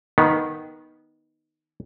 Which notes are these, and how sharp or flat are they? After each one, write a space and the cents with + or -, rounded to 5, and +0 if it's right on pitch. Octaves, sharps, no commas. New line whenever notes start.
D#3 +0 B3 -15